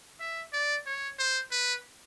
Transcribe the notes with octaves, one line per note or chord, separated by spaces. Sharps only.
E5
D5
C#5
C5
B4